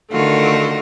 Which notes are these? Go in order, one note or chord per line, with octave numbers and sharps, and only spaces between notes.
D3 D#3 A3 F4 F#4